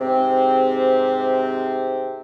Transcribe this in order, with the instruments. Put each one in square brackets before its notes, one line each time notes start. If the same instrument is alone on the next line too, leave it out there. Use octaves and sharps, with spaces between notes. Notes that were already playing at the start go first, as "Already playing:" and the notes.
[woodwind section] G#2 C3 C4